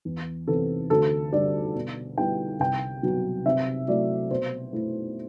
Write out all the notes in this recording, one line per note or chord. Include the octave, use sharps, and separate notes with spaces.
E2
C3 E3 B3 A4
D2 A4
D3 G3 D5
B2
G3 B3 E4 G5
C2 G5
B2 F#3
C3 E5
F#3 A3 E4 D5
B2 C5
A3 E4